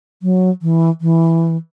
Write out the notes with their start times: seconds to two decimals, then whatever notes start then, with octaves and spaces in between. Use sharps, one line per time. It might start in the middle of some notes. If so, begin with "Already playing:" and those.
0.23 F#3
0.62 E3
1.01 E3